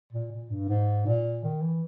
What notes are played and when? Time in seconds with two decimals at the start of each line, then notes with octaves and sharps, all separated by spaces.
0.13 A#2
0.31 A#2
0.50 G2
0.68 G#2
1.06 A#2
1.43 D#3
1.62 E3